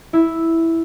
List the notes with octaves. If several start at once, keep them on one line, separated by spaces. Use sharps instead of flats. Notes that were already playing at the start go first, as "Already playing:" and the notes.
E4